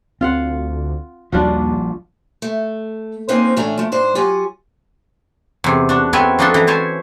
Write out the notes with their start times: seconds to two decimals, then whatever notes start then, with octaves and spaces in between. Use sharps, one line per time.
0.21 D2 C4 F4 F5 F#5
1.32 A#1 D#2 F3 G3 D4 F4 F#4
2.42 A3
3.28 A#3 C4 C#4 D#4 B4 C5
3.56 A2 E3 A3 C#4 D4 A#5
3.77 F3 A3
3.92 G#2 D4 C5
4.15 F#3 F4 G4 F#5 G#5
5.64 E2 C3
5.89 D4 F#4
6.13 B3 C4 A#4 C#5 E5 G#5
6.39 F3 D4 D#4 F#4 A4 C6
6.54 E3 A#5
6.67 E4 C5 C#5 G#5 A5